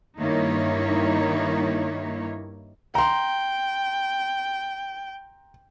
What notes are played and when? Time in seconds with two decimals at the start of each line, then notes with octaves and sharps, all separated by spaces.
0.19 G2 D#3 A#3 D#4 E4 C#5
2.95 G5 A#5 C6